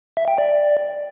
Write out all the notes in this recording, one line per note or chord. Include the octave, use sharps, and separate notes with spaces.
E5
G5
D5